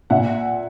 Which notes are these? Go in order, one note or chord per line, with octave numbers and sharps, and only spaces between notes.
A#2 E5 F#5